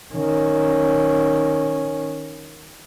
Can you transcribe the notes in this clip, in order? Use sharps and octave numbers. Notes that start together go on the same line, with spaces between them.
D#3 C#4